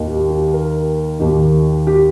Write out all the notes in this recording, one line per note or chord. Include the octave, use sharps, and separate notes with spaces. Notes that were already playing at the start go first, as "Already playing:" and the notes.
Already playing: D#2 D#3
G4
G4
A#4
D#2 D#3 G4
G4